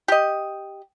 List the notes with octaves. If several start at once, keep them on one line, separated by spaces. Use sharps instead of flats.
G4 D#5